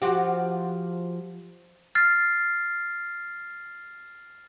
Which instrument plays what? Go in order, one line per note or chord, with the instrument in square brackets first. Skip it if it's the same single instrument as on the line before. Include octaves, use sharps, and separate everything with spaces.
[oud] F3 F#4 G4
[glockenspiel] F6 A6 C7